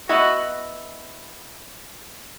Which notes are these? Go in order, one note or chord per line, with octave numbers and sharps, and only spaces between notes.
B3 E4 F#4 B4 D#5